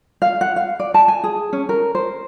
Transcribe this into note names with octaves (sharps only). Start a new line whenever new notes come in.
F5
F#5
F5
D5
A5
G#5
G#4
C#4
A#4
C5